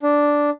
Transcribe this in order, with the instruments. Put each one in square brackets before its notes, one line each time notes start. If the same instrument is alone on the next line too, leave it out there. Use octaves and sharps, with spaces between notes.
[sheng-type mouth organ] D4